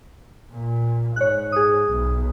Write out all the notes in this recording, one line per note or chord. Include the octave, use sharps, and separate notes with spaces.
A#2
G#2 C#5 F#6
G#4 D#6
B1